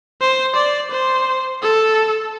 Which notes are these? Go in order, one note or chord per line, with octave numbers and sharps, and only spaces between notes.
C5
D5
C5
A4